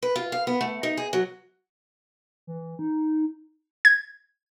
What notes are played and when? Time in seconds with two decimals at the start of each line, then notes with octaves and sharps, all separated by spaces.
0.03 B4
0.16 F4
0.32 F5
0.47 B3
0.61 A3
0.83 D#4
0.97 G#4
1.13 F#3
2.47 E3
2.79 D#4
3.85 G#6